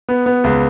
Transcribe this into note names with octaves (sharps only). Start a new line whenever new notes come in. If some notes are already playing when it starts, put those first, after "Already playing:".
B3
B3
C#2